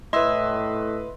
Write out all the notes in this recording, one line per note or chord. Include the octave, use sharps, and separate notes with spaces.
A2 E4 B4 D#5 C6 E6